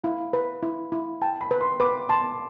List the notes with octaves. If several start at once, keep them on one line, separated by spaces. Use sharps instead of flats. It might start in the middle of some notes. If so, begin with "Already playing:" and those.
E4 F5
B4
E4
E4
G5 A5
B5
B4
C6
B4 D6
A5 C6